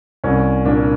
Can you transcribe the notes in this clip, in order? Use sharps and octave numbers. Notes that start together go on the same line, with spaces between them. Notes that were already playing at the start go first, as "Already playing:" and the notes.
C2 C#4
A#2 D4